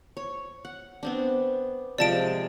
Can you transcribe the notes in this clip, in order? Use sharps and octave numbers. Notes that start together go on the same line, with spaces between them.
C#5
F#5
B3 C4 D4
C3 F3 G#3 D5 A5 D7